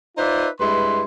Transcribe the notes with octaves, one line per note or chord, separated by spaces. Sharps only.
D#4 F4 B4 C5 D5 E5
G2 G#3 E4 B4 C6